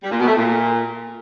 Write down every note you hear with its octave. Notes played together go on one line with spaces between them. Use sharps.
G3
A#2
B2
A3
A#2